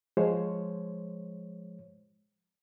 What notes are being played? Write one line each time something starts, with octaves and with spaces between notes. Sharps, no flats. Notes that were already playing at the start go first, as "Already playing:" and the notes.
F3 G#3 C5 C#5